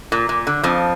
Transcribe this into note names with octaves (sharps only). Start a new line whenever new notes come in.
A#2
A#2
D3
F2 F3